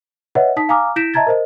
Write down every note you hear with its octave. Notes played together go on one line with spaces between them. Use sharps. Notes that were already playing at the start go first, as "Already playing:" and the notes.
B4 C#5 D#5 E5 F#5
D#4 A5 D#6 B6
F5 G#5 A#5 D6 D#6 F6
E4 G6 A#6 B6 D7 E7
D#5 E5 A5 A#5 G#6 A6
A#4 C5 D#5